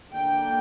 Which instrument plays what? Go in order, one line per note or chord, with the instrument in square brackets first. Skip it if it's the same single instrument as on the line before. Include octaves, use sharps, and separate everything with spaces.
[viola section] D3 A#3 D4 G5